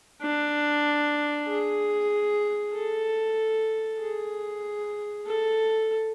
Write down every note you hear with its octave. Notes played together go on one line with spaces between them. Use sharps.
D4
G#4
A4
G#4
A4